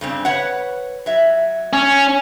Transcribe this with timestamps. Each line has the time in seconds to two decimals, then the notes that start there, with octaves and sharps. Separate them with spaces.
0.01 G2 C#3 C4
0.25 B4 C#5 F#5
1.06 F#3 E5
1.73 C#4